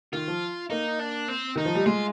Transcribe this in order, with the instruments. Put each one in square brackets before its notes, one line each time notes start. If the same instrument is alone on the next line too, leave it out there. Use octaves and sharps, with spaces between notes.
[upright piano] D#3 [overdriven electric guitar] F4
[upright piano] F3
[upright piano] A#3 [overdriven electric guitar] D#4
[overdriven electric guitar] D4
C4
[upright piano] D#3 [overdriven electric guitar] D#4
[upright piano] F3
G3
[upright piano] G#3 [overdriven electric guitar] F4